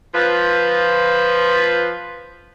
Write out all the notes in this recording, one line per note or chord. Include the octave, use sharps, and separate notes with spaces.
F3 B4